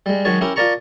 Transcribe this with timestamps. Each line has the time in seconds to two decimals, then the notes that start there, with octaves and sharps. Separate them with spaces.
0.06 G3 G#3
0.25 D#3 F#3 G#3 C#5 A5
0.41 C#4 E4 G4 A#4
0.56 F4 A#4 D5 A5 A#5 C#6